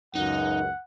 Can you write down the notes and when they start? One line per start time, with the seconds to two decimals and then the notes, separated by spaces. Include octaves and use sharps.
0.15 C#2 F#2 D#4 F#5